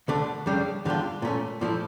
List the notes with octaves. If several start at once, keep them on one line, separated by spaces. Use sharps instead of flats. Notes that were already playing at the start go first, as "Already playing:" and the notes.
D2 D3 A3 D4
F2 C#3 G3 D4
E2 D3 G3 D4 F4
A#2 A3 C#4
A#2 F3 A3 E4